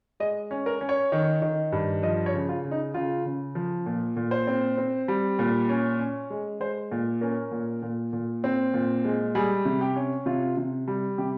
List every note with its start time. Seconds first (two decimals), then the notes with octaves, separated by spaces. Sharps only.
0.20 G#3 D#5
0.51 C#4
0.66 A#4
0.81 C#4
0.89 C#5
1.12 D#3
1.42 D#3
1.72 G2
2.03 F3 D#5
2.26 C#5
2.34 C#3
2.49 F4
2.65 C#3
2.71 D#4
2.94 C#3 F4
3.25 C#3
3.55 F3
3.86 A#2
4.17 A#2
4.31 C5
4.47 C4
4.77 C4
5.08 G3
5.39 A#2
5.69 C#4
5.99 C#4
6.30 G#3
6.60 G#3 C5
6.91 A#2
7.21 C#4 A#4
7.52 A#2
7.83 A#2
8.13 A#2
8.44 C4
8.74 A#2
9.05 G#3
9.35 G3 G#4
9.65 C3
9.81 G4
9.96 C#4
10.26 C3 F4
10.57 C3
10.88 G3
11.18 C3 G4